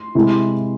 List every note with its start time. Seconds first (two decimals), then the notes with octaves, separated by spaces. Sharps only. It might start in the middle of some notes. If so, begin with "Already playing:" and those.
Already playing: C6
0.15 C3 E3 G#3